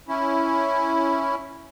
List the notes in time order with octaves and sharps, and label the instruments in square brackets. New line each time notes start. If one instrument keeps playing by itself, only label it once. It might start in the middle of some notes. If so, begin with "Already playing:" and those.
[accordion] C#4 E4